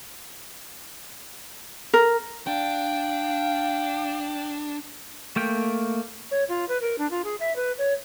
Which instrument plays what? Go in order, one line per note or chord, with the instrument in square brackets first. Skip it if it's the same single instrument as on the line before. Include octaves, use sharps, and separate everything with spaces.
[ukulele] A#4
[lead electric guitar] D4 [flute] F5 [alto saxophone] G5
[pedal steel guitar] A3 A#3 G5
[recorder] C#5
F4
B4
A#4
D4
F4
G#4
E5
B4
C#5